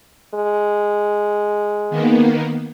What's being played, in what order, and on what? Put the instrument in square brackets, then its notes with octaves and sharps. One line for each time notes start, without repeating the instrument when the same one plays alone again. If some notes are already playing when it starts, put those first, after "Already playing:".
[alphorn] G#3
[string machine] D#3 A#3 B3